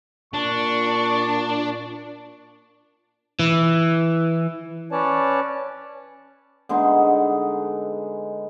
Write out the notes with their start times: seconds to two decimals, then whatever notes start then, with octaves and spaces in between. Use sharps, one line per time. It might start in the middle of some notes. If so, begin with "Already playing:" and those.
0.34 A#2 D4 C#6
3.39 E3
4.92 C#4 B4 C#5 D5 A5
6.69 D3 G#3 B3 D#4